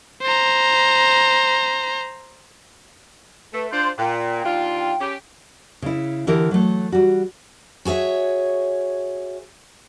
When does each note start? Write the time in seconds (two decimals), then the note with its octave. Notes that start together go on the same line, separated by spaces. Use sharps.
0.22 C5 A#5
3.53 A3 B4
3.72 D4 F4 C5 C6 G6
3.98 A#2 G5
4.44 D#2 D4 F4
5.01 C#4 G4
5.82 C#3 E4
6.27 D3 E3 E4 G4 A#4
6.51 F#3 A3
6.92 G3 F#4
7.85 F#4 G#4 C#5 E5